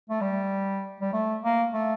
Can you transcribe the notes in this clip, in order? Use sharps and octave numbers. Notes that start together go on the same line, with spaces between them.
A3
G3
G3
A3
A#3
A3